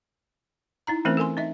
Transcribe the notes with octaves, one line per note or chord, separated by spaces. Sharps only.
D#4 E4 A#5
E3 A3 C4 C#4 A#4 C5
A4 A#4 G#5 C6
D#4 D#5 E5